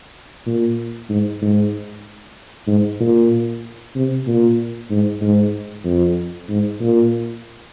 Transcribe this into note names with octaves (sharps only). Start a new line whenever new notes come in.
A#2
G#2
G#2
G#2
A#2
C3
A#2
G#2
G#2
F2
G#2
A#2